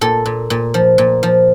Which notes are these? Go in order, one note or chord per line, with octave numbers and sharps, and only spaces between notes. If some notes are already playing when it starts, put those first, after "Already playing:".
A#2 A4
A#2
A#2
F3
A#2
F3